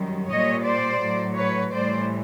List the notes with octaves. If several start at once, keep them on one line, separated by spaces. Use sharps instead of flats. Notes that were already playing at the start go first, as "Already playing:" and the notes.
Already playing: F#2 D#3 G3
A#2 G3 C#5 D#5
C5 D5
A2 F#3
B4 C#5
A2 E3 G3 C5 D5